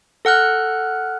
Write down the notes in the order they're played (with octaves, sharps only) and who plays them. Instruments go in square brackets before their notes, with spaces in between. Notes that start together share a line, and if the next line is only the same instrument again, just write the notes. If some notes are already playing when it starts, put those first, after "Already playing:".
[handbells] A4 F#5 F6 F#6